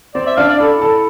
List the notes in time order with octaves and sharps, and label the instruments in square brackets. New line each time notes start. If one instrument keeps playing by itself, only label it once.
[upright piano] C4 [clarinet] D5
[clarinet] E5
[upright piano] D4 [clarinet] F5
[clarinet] D5
[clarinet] E4 [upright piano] A4
[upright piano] A4